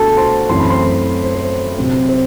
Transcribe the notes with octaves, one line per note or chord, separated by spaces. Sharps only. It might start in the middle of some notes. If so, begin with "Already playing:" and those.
Already playing: B2 A3 D4 F#4 A4 A5
C5 C6
F#2 E3 A3 C4 C6
B5
C5 C6
C5
C5
C3 F#3 C4
C5